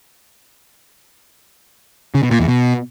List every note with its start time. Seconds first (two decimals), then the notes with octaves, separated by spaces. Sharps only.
2.15 C#3
2.23 B2
2.31 A#2
2.39 E2
2.48 B2